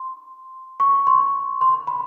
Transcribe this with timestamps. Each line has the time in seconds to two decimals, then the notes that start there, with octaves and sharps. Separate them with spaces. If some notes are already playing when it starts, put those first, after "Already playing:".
Already playing: C6
0.80 C#6
1.07 C6
1.61 C6
1.87 B5